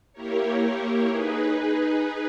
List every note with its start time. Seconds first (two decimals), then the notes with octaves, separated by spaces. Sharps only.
0.13 A#3 E4 G4 A#4 C#5
1.09 D#4 G#4 B4